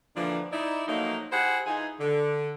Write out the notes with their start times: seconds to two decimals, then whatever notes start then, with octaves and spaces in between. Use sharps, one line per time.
0.16 A#2 D3 E3 F3 D4 D5
0.52 D#4 E4 D5
0.87 F3 F#3 A3 A#3 D#4
1.32 E4 G4 G#4 C5 F#5
1.66 E3 D#4 F4 G#4 G#5
2.00 D3